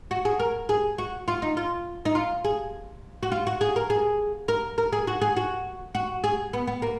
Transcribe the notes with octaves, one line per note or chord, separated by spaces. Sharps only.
F#4
G#4
A#4
G#4
F#4
F4
D#4
F4
D#4
F4
G#4
F#4
F4
F#4
G#4
A#4
G#4
A#4
A#4
G#4
F#4
G#4
F#4
F#4
G#4
B3
B3
A#3